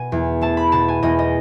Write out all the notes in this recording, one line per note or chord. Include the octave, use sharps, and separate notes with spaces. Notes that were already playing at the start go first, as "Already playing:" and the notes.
Already playing: B2 G#5
E2
A3 A5
B5
B2 A5
G#5
E2 D#5
D#5